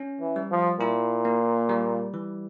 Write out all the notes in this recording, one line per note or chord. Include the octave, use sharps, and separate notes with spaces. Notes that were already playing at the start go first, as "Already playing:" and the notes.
Already playing: C#4
E3
G3
F3
A#2 E4
A#3
G3
E3